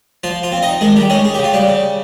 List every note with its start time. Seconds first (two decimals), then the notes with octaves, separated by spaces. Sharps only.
0.23 F3 F4
0.43 F4
0.52 C4
0.62 D#4 D#5
0.81 D#3 G#3 G#4
0.96 G3 G4
1.10 G#3 C#4 G#4
1.25 G#4
1.34 C#3 G4
1.44 F4
1.53 G3 G4
1.68 C#3